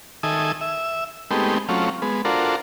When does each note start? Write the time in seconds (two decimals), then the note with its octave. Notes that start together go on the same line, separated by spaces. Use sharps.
0.23 D#3 A4 E5 G#5 D#6
0.61 E5
1.31 G#3 A3 B3 C4 D#4 G4
1.69 F#3 A3 C4 C#4 F4
2.02 G#3 B3
2.25 D4 F4 F#4 A4 A#4 C5